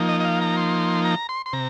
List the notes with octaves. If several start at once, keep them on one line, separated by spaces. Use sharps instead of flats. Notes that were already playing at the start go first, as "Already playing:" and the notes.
Already playing: F3 A#3 D#4
D#5
D#5
F5
A#5
C6
A#5
C6
C6
C3 A#5